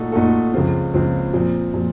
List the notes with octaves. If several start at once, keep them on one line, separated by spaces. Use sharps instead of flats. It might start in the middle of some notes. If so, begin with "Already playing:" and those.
Already playing: A#2 A3 D#4 F#4 A4
A#2 A3 D#4 F#4 A4
C#2 C#3 F3 C4 F4
C#2 C#3 F3 C4 F4
A#2 F3 C4
A#2 F3